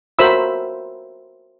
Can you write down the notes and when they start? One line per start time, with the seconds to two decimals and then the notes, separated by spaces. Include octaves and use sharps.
0.19 F#4 A#4 C5 E5 B5 E6